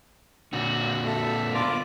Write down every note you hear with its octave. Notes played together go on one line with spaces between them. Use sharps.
A#2 D3 F#4
A4 E5
B3 D4 F4 A#4 D5 D6